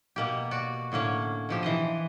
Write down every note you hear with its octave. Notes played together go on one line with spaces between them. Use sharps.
B2 A#3 G4
F#4 D5
A2 D3 A#3 C#4
B2 F3 G4
E3 C5 D#5